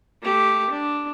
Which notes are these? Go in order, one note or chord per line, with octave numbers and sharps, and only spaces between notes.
A3 G4
D4